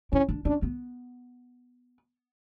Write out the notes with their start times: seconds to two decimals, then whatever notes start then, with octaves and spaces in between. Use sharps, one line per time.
0.12 C#4 E4
0.29 D4
0.45 C#4 D4
0.62 B3